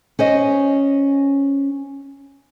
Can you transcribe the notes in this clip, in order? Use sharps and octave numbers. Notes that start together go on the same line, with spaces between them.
C#4 C5 D#5